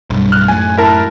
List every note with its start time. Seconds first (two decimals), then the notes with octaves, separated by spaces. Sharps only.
0.10 B1 G2
0.32 F6 F#6
0.48 F#2 A2 G#5
0.78 E4 A#4 A5